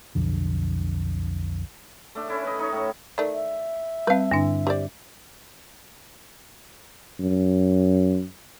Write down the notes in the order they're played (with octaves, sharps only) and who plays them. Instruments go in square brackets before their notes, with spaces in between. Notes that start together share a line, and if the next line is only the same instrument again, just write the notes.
[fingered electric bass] B1 F2 D3
[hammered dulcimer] A3 D4
C#4 E4 A4
B4 D#5
D#4 C#5
A2 A4 D#5 C#6
[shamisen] D#3 A3 [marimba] D5
[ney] E5
[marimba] G3 C4 [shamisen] B4 F5
[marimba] G2 D3 D4
[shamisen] G4 C5 D5
[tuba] F#2